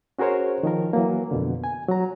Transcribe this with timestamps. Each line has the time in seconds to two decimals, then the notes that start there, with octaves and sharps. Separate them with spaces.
0.19 C#4 F#4 G#4 A#4 C5 C#5
0.63 D#3 F3 A#4
0.93 E3 F#3 A#3
1.31 F2 B2 D3
1.64 G#5
1.89 F#3 A#5